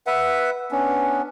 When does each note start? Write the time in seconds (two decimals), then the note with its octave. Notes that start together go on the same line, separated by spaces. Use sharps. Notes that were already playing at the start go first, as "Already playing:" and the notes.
0.07 B4 E5 F#5
0.71 B3 C#4 D4